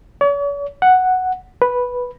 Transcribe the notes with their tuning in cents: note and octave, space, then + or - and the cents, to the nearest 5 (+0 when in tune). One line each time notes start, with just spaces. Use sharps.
C#5 +45
F#5 +0
B4 -5